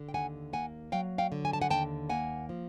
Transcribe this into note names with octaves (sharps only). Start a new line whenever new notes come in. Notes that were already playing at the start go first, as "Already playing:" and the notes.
Already playing: D3
G5
D#2 F#5 G#5
A#3 F#5 G#5
F#3 F5 G5
F5 G5
D3
G#5
A5
F#5 G#5
D#2 G5 A5
A#3 F#5 G#5
F3